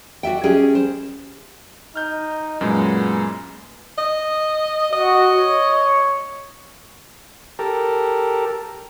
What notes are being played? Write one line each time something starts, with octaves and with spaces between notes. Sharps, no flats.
F#4 D5 E5 G5
G3 C#4 G#4 G5
C5
D#4 F6 G6
F#2 A#2 G#3 B3
D#5
F#4 D#5
C#5
G4 A4 A#4